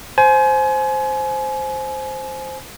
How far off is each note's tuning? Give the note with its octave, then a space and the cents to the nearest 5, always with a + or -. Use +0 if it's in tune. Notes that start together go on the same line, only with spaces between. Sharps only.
C5 +0 G#5 +30